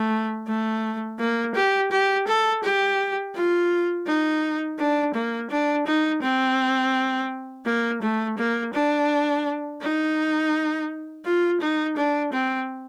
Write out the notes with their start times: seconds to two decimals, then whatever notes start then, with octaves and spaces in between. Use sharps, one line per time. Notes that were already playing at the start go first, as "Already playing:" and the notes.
Already playing: A3
0.47 A3
1.19 A#3
1.55 G4
1.91 G4
2.27 A4
2.63 G4
3.35 F4
4.07 D#4
4.79 D4
5.14 A#3
5.50 D4
5.86 D#4
6.23 C4
7.65 A#3
8.02 A3
8.38 A#3
8.73 D4
9.82 D#4
11.25 F4
11.61 D#4
11.97 D4
12.33 C4